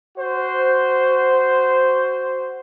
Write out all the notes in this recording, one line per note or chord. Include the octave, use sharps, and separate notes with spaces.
F#4 C5